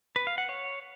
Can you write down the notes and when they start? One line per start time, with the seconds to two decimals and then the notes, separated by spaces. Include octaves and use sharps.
0.16 B4
0.27 F5
0.38 F#5
0.49 C#5